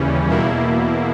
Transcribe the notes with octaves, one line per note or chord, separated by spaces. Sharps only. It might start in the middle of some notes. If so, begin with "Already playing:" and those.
Already playing: D#2 C#3 E3 G3 C#4
E2 B2 A#3 E4